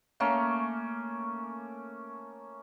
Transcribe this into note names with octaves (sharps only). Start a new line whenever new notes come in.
A3 A#3 C#4